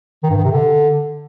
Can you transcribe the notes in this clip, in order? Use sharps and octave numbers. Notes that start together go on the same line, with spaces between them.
D#3
G2
D#3
C3
D3